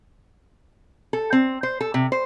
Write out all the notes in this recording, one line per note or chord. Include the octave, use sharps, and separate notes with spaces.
A4
C4
C5
A4
C3
C5